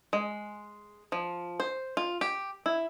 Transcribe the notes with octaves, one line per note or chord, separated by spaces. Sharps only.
G#3
F3
C5
F4
G4
E4